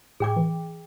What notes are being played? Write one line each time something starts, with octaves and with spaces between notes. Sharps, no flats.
A2 G#4 G5 D6
E3